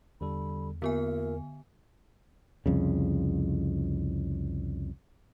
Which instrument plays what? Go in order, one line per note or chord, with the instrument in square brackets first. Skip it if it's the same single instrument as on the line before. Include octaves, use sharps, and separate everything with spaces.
[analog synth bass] E2 [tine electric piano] D3 G3 A4 [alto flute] B5
[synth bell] D3 B3 G#5 [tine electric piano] A#3 F4 E5 [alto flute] A#4
[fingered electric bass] C2 F2 C#3